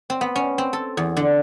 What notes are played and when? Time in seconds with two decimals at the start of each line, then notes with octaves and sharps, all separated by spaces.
0.10 C4
0.21 B3
0.36 C#4
0.58 C4
0.73 A4
0.97 E2
1.17 D3